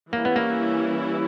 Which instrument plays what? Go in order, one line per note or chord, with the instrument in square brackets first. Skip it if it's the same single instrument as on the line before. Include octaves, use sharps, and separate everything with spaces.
[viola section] E3 G3 C#4 E4 [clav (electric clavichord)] A#3
[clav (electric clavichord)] B3
A#3